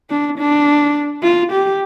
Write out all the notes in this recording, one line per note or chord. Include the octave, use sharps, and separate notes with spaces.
D4
D4
F4
G4